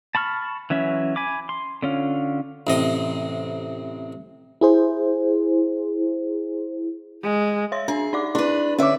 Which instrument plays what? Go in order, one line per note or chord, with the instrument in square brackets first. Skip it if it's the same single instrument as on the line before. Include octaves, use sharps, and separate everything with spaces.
[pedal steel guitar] A5 B5 C#6 F6
E3 F#3 C#4 E5
G#5 B5 D6
C6
D3 C#4 F4
[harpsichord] A1 C3 D#5
[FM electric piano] E4 G#4 C5
[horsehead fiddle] G#3
[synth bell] C#5 C6 A#6 [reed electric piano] E5
[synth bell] D4 [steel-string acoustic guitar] G#4
[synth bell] D#4 D5 D6
[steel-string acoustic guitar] D4 B4 [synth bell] E4
[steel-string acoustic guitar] D3 E5 [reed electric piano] C#4 C#5 D6